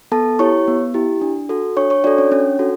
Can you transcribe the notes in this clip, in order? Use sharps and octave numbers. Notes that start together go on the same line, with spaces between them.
B3 A4 A5
E4 G4 C#5 C#6
B3
E4 G4
D4
F#4 A4
D4 C#5 C#6
C#5 C#6
D4 F#4 A4 D5
C#4 C#5
C#4 D4 C#5
F#4 A4